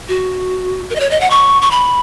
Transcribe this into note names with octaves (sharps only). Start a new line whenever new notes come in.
F#4
A#4
D#5
C#5
D#5
F#5
C#6
C#6
B5